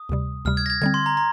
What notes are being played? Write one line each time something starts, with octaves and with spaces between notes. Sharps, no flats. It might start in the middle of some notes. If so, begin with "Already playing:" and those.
Already playing: D#6
D2 C3 G3
D2 C3 G3 F6
G#6
A#6
G#6
D3 G3 C4 G#6
C6
A#5
A#5